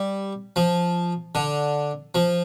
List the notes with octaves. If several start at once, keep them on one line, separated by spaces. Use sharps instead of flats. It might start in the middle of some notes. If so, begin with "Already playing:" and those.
Already playing: G3
F3
D3
F3